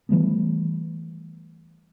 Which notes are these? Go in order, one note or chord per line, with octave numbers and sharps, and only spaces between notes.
E3 G3 A3 B3